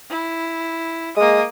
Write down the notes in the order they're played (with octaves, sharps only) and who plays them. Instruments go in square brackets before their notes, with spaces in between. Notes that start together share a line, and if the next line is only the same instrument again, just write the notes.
[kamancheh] E4
[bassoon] G#3 [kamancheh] A#3 D#6